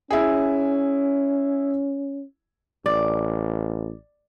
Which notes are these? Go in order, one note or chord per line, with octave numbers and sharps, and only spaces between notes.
C#4 E4 G#4
A1 D5